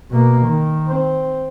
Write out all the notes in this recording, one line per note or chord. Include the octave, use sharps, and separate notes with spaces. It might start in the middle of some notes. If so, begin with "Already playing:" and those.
B2 A#3
D#3
C4